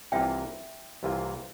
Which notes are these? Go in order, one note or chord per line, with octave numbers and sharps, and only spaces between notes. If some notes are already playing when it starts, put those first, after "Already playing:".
C2 C3 E3 A#3 F4 E5 G5
C2 C3 E3 A#3 F4